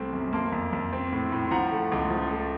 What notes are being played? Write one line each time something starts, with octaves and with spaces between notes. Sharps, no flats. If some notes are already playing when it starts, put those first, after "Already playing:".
Already playing: C2 A3 C4
F#2
A#3 A5 C6
F2
F2
C4
A2
A2
C6
F3 F#5 A#5
A3
C#2
F3
A3